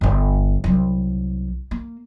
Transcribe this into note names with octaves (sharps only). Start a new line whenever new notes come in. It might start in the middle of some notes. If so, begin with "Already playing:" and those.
G1 D3
C2 F#3
A#3